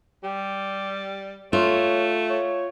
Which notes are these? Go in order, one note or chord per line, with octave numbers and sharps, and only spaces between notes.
G3 G4
A3 F4 C#5
C#5